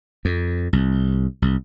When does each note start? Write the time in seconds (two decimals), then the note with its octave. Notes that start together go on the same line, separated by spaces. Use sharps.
0.25 F2
0.73 C2
1.42 C2